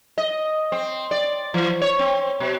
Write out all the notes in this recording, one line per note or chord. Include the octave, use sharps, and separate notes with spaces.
D#5
C4
D5
E3
C#5
C4
B2